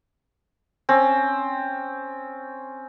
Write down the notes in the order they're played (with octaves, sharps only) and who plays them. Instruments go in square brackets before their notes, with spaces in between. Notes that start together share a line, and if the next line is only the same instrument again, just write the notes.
[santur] C4 C#4